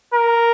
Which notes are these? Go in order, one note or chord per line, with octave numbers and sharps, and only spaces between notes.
A#4